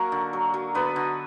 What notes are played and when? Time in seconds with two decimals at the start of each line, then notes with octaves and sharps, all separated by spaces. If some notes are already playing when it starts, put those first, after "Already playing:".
Already playing: F#3 A#3 F#4 A#4
0.12 D3
0.33 F#3
0.54 F#3
0.75 D3 B3 B4
0.96 D3